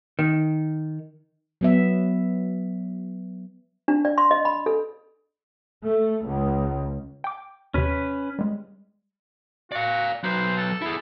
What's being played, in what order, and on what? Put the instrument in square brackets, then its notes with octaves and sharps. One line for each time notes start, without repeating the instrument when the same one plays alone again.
[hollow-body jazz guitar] D#3
[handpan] F#3 B3 E5
[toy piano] D4
D5
C6
D#5
B5
A4
[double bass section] A3
C#2
[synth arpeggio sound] G5 D6
[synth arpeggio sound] D#2 C3 [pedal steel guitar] C#4 B4
[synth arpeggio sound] G3 G#3
[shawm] F#4 [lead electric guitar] D5 F5
[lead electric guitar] F#3 B4 [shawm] C5
[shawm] A4
[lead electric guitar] E4 G#4